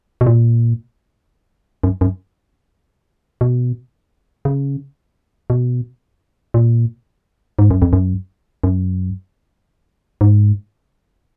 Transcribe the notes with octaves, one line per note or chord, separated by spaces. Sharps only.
B2
A#2
F#2
F#2
B2
C#3
B2
A#2
G#2
F#2
F2
F#2
F#2
G#2